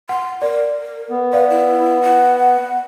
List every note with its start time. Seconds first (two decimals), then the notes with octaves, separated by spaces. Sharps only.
0.09 F#5 C6
0.42 A#4 D5
1.10 B3
1.33 B4 D5 F5
1.50 E4
2.03 F#5